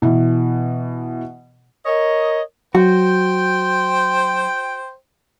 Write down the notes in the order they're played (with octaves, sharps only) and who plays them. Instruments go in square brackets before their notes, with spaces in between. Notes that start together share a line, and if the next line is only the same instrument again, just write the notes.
[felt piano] B2 E3
[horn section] A#4 C#5 D#5
[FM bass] F#3 [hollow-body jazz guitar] F#4 [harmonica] C5 G5